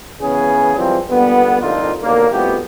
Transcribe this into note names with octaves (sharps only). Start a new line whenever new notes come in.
C#3 E3 B3 C#4 G#4
E3 F3 G3 G#3 C4
A#2 D3 G3 B3
C2 F2 D3 A#3 D#4 F4
D#2 B2 D3 A#3
C2 F2 A3 B3 F#4 G4